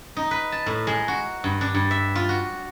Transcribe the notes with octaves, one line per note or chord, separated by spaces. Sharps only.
D#4
B4
A5
A2
G#3
F#4
G2
D4
G2
E5
F4
F#4